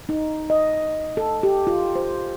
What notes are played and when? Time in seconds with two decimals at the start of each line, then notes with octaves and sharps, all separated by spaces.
0.09 D#4
0.50 D#5
1.17 A4
1.43 G4
1.67 F4
1.96 C5